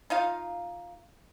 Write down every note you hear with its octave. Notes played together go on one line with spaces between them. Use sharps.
D#4 F4 F5